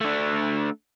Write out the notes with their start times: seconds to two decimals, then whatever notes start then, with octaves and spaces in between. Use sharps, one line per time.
0.01 A3 D4